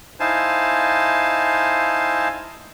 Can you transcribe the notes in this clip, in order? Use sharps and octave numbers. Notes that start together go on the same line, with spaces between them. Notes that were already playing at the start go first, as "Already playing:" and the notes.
D#4 E4 C5 F5 G#5 A5